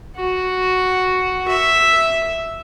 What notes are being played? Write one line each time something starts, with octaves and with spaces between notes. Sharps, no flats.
F#4
E5